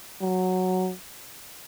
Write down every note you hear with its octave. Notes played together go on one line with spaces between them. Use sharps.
F#3